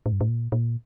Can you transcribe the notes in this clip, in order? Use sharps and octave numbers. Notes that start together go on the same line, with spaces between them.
A2
G2
A2
A#2
A#2